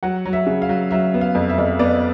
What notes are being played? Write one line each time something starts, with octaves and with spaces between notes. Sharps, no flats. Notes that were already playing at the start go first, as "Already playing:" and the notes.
F#3 F#5
F#3
E5
C#3
F5
F#3
F#3 E5
B3
F5
F2
E5
F2
B3 D5